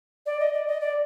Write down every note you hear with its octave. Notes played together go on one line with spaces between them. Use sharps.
D5
D#5
D5
D#5
D5